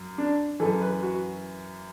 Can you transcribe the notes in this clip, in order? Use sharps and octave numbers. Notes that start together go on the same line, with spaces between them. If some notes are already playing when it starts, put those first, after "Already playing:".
Already playing: F#2
D4
F#2 E3 A4
B4
F#4